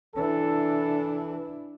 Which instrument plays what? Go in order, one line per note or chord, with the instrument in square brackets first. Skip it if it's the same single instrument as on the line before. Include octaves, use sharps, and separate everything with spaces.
[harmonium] E3 [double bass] D4 E4 [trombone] A4